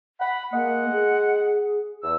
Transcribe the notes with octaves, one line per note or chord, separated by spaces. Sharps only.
F#5 B5
G#3 A#3 D#5 F#5
G#4
E2 E6